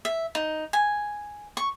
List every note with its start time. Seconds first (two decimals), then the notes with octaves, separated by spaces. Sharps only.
0.05 E5
0.35 D#4
0.73 G#5
1.57 C#6